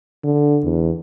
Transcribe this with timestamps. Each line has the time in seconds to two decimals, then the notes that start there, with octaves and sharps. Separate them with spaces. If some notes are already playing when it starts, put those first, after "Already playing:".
0.24 D3
0.64 E2